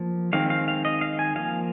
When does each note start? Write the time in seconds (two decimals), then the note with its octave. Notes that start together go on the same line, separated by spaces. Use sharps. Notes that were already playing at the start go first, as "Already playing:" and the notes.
Already playing: F3 A#3
0.33 D#3 G#3 C4 F5
0.50 F5
0.68 F5
0.85 D#5
1.01 F5
1.19 G#5
1.36 F3 A#3 F5